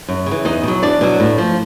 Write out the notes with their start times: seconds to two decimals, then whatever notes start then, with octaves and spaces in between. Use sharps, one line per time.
0.08 F#2
0.26 C#3 E3
0.45 E2 D#4 D#5
0.63 B2 F#3
0.83 E2 D4 D5
1.01 B2 F#3
1.20 A2
1.38 F3